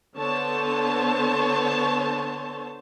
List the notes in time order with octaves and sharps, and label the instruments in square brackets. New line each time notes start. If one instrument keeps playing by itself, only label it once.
[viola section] D3 B3 C5 C#5 A5